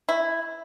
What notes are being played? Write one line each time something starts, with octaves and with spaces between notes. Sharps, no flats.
E4